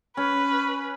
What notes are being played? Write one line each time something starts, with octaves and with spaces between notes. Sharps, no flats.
C#4 B4